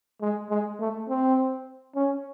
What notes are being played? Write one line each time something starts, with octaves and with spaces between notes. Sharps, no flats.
G#3
G#3
A3
C4
C#4